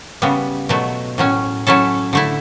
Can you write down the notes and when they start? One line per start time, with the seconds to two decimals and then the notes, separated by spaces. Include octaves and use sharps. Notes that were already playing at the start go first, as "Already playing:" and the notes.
0.22 C#3 G3 B3
0.69 B2 F#3 A3
1.18 A2 F#3 C#4
1.67 F#3 C#4 E4 A4
2.13 D3 A3 E4